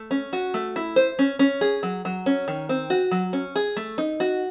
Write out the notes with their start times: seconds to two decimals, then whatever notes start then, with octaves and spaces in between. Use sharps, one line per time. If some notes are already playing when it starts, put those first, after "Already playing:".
Already playing: A3
0.11 C#4
0.33 F#4
0.54 A3
0.76 E4
0.96 C5
1.19 C#4
1.39 C#4
1.61 G#4
1.83 F#3
2.05 F#3
2.26 C#4
2.48 D#3
2.69 C4
2.90 F#4
3.11 F#3
3.33 C#4
3.56 G#4
3.77 A3
3.98 D#4
4.20 F#4